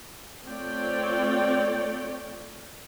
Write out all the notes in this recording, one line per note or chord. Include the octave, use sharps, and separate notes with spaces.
A3 C4 F4 C#5 D5 G5